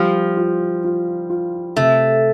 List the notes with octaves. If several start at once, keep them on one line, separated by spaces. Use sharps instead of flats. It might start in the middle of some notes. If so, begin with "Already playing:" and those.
Already playing: F3 G3
F4
F4
F4
C3 A3